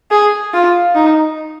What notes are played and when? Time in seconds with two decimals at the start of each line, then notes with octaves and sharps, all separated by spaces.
0.11 G#4
0.54 F4
0.95 D#4